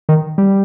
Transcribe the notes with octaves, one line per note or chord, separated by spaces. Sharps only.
D#3
G3